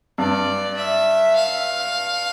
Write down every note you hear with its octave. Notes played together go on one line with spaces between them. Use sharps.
G2 D5
E5
F5